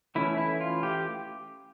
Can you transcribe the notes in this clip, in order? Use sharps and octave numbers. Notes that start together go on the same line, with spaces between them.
E3 A3 C#4 E4
E4
F4
G4